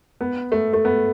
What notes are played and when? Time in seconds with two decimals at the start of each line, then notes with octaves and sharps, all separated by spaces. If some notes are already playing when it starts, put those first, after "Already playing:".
0.21 B3
0.52 A3
0.73 A3
0.85 B3